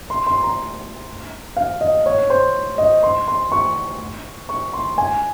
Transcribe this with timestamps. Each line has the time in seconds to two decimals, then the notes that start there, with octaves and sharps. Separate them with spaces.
0.10 C6
0.26 C6
0.43 A#5
1.57 F5
1.81 D#5
2.06 C#5
2.30 C5
2.78 D#5
3.03 C6
3.28 C6
3.52 C#6
4.49 C#6
4.73 C6
4.98 G#5